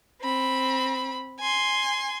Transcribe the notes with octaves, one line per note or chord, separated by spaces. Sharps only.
C4 B5
G#5 C6